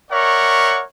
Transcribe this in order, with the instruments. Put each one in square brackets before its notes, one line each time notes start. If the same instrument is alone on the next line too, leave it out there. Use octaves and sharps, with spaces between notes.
[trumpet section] A#4 C#5 D5 E5 F#5 C#6